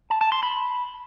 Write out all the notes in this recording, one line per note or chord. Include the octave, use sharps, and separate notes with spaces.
A5
A5
C6
B5